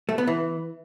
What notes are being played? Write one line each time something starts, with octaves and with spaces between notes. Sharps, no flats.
A3
B3
E3